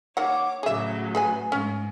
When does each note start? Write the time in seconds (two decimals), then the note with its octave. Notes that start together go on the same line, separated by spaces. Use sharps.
0.17 D#3 A#3 C#5 F#5 D6
0.63 A2 C#3 F#3 G#4 E5
1.15 G#4 B4 G#5
1.52 G#2 C#4